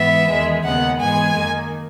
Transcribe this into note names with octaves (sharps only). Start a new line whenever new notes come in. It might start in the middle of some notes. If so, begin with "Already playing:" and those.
Already playing: G#2 E3 B3 E5
E2 D#3 G#3
D#2 C#3 G#3 B3 F#5
G#2 E3 G#3 B3 G#5
F#2 D#3 A#3